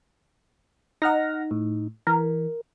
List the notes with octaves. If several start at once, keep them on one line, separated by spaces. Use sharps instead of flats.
D#4 F#5 F6 A#6
A2
E3 A#4